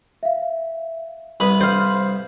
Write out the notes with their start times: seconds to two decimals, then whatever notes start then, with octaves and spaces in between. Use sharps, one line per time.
0.23 E5 F5
1.40 C2 B4 D#6 F#7
1.61 C5 F5